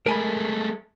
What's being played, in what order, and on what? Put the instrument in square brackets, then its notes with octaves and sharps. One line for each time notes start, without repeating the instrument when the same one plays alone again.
[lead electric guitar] G#3 A3 [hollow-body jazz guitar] A#4 G#5 B5